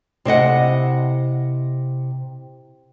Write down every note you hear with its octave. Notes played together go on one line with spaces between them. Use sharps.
C3 E4 D#5 F#5